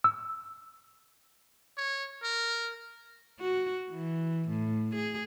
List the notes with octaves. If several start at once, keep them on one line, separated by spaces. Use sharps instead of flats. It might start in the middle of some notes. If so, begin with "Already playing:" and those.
E6
C#5
A#4
F#4
E3
A2
G#4